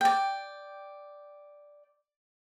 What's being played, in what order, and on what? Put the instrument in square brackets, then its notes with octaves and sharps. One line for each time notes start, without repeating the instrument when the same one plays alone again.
[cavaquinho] D5 G5